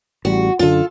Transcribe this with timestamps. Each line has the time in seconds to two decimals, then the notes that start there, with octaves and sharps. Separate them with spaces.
0.25 A1 G3 F#4
0.59 F#2 D3 F4 A4